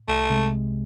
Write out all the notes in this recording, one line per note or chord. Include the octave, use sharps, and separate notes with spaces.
C2 A3
C3 G#3